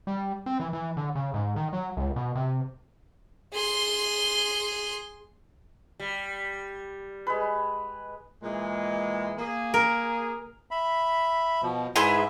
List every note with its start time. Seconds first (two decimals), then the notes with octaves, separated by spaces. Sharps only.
0.07 G3
0.46 C4
0.60 E3
0.73 E3
0.97 D3
1.15 C#3
1.34 G#2
1.56 D#3
1.73 F#3
1.97 C#2
2.16 B2
2.35 C3
3.53 G#4 C6
6.00 G3
7.27 G#3 B4
8.43 A#2 E3 G#3
9.37 A#3 G#4
9.74 A#4
10.71 E5 B5
11.62 B2 F3
11.96 G#2 E4 G#4 B4 E5 C6